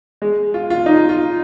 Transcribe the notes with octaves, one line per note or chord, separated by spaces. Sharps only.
G#3
F4
F4
D#4
F4